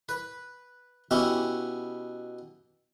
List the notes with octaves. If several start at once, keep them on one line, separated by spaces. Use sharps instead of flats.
B4
B2 B3 C#4 E4 G4